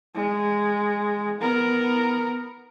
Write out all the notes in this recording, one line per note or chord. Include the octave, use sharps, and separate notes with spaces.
G#3
B3 A#4